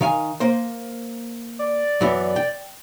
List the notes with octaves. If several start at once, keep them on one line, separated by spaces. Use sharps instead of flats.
D#3 F5 G#5
A#3 C5
D5
F#2 E3 B3
G5